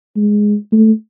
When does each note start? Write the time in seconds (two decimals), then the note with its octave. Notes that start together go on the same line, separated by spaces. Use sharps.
0.16 G#3
0.72 A3